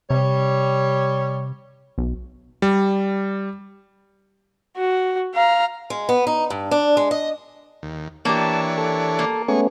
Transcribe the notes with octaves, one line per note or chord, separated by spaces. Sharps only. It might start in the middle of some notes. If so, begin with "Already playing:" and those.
C3 G3 C#5
B1
G3
F#4
F5 A#5
G#3
B3
D#4
G2
D4
G#3
D#5
D#2
E3 A#3 D4 G4 C#5 A5
A4
A#3
G#3 A3 B3 C#4 C#6